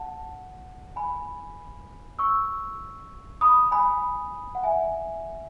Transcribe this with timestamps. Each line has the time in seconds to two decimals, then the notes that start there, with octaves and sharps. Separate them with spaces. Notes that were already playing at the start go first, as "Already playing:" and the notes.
Already playing: F#5 A5
0.96 G#5 B5
2.19 C#6 E6
3.41 B5 D#6
3.71 G#5 B5
4.55 F#5
4.63 E5 G#5